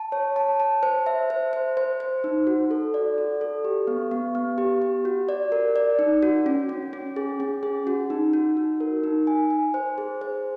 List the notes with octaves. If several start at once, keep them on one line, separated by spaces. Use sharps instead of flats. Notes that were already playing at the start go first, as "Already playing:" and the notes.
Already playing: A5
C#5
A5
A5
C5
E5
C5
C5
C5
C5
D#4
F#4
A4
D5
F#4
A4
G4
B3
B3
B3
G4
G4
F#4
D5
A#4
D5
D#4
F#4
C#4
C#4
C#4
G#4
C#4
G#4
F#4
D#4
F#4
D#4
A#4
D#4
G#5
G#5
C5
G#4
C5